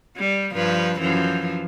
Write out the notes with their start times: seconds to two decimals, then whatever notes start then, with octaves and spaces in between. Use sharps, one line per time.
0.17 G3
0.53 G2 F3 B4
1.00 F#2 E3 F3